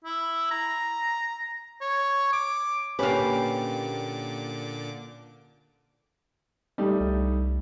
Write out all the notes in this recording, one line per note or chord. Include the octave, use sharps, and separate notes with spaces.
E4
A#5
C#5
D6
A#2 D3 A#3 C#4 G4 B4 D6
G3 A3 D#4
C2